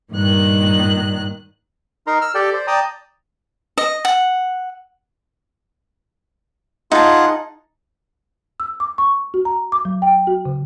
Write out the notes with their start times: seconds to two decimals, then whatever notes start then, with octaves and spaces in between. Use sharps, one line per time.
0.12 G2 A#2 D#3 F#6
2.07 D#4 A#4 A#5 C6
2.21 E6 F6
2.35 G4 A4 D5 G5
2.53 C5 D5
2.67 D5 G5 A5 A#5 D#6
3.78 D#5
4.05 F#5
6.92 D#4 F4 G#4 F#5 A5
8.60 E6
8.80 D6
8.98 C#6
9.34 F#4
9.45 A#5
9.72 D6
9.85 F#3
10.02 G5
10.27 F#4
10.45 C#3